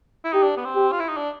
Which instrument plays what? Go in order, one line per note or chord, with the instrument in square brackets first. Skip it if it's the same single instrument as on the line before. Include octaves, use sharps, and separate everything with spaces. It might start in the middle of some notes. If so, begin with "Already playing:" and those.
[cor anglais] E4
[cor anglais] D#4 [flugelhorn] G4
[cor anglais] D4
B3
C4
[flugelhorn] G4
[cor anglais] F4
E4
D#4
D4